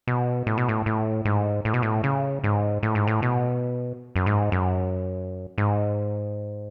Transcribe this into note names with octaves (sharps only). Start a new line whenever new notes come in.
B2
A2
B2
A2
A2
G#2
A2
B2
A2
C#3
G#2
A2
G#2
A2
B2
F#2
G#2
F#2
G#2